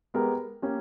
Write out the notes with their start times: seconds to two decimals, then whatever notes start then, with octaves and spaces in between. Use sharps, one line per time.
0.14 G#3 B3 G4 A#4
0.62 A#3 C#4 G4